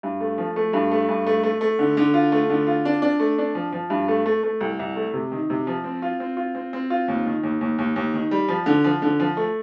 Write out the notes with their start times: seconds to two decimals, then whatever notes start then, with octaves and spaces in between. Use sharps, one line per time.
0.03 G2
0.20 A3
0.38 F3
0.56 A3
0.73 G2
0.91 A3
1.09 G2
1.27 A3
1.43 A3
1.61 A3
1.79 D3
1.97 D3
2.14 F4
2.32 A3
2.50 D3
2.67 F4
2.85 D4
3.02 D4
3.20 A3
3.38 D4
3.55 F3
3.72 F3
3.90 G2
4.08 A3
4.26 A3
4.43 A3
4.61 C2
4.79 C2
4.96 A3
5.13 C3
5.32 D#3
5.50 C3
5.67 F3
5.84 C4
6.02 F4
6.20 C4
6.37 F4
6.55 C4
6.73 C4
6.90 F4
7.08 D#2
7.26 D#3
7.43 D#2
7.61 D#2
7.78 D#2
7.96 D#2
8.14 D#3
8.31 G3
8.48 F3
8.66 D3
8.84 F3
9.02 D3
9.20 F3
9.37 A3